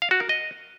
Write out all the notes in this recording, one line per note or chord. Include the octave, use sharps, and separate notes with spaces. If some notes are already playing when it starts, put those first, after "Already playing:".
F5
F#4
A#4
D#5